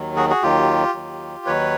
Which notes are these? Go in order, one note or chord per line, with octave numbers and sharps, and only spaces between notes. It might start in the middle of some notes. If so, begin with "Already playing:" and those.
Already playing: D#2 D#3 F#3
F#4 G#4
F#4 G#4
D#2 D#3 F#3 F4 G4
D#2 D#3 F#3
D#2 D#3 F#3 B4 C#5